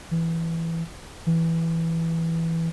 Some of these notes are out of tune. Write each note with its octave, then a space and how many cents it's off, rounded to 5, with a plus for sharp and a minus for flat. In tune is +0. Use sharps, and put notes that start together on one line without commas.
E3 +5
E3 +0